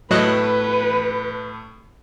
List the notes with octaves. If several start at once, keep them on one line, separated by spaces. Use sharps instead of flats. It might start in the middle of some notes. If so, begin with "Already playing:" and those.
A2 F#3 A3 B4 D#5 F#6 E7